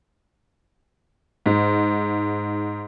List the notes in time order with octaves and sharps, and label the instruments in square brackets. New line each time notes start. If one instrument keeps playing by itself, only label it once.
[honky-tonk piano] G#2